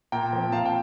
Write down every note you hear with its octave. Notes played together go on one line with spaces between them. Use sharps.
A#2 G5 A#5
F3 C4
A#2 F5 A5
G5